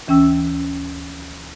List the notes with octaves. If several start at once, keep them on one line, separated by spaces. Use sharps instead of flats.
D2 E3 C#4 G5 E6